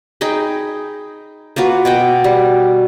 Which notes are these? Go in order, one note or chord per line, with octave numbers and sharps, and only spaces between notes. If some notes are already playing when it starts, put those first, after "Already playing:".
D#4 G#4 G5 B5
A#3 F4 F#4 B4
B2 F#5 G5
G3